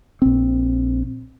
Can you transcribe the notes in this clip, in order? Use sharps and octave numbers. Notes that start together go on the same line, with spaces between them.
A#1 C4